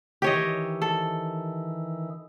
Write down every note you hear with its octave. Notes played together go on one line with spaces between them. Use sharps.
D#3 E3 G4 C#5 D#5
A4